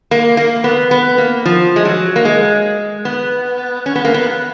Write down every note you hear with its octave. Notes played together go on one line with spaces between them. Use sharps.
A#3
A#3
B3
B3
A#3
F3
G#3
F#3
A#3
G#3
B3
C#4
B3
A#3
B3